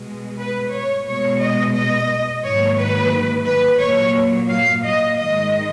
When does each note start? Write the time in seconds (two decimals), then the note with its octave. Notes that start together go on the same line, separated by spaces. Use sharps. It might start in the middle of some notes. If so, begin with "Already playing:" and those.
Already playing: B2 G#3
0.39 B4
0.73 C#5
1.07 B2 G#3 C#5
1.41 D#5
1.75 D#5
2.43 G#2 D#3 F#3 A#3 C#5
2.77 B4
3.45 B4
3.79 A#2 F#3 A#3 C#5
4.48 F5
4.82 D#5
5.16 G#2 D#3 G#3 D#5